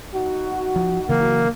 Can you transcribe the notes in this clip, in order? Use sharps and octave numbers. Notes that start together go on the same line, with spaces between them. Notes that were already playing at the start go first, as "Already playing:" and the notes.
D#4 F#4
F3
C#3 E3 F#3 A#3